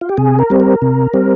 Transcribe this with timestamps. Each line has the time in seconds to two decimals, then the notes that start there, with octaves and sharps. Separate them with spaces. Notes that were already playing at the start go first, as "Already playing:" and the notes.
0.01 F4
0.09 G4
0.17 C3 G#4
0.39 A#4
0.50 G3 C4
0.60 A#4
0.82 C3
1.13 G3 C4